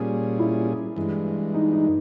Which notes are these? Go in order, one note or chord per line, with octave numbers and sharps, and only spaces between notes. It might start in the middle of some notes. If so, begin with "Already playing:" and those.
Already playing: A#2 G3 C#4 G#4
E4
G2 E3 G#3
D#4
D#4